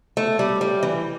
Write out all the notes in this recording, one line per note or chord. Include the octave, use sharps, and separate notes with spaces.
A3
G3
G3
E3